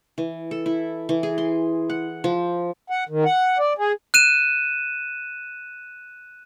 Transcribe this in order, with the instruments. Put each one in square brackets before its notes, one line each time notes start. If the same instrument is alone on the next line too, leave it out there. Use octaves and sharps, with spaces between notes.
[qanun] E3
A4
E4
E3
G#4
C6
F#5
F3
[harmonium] F#5
D#3
F#5
D5
G#4
[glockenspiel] F#6 D#7 E7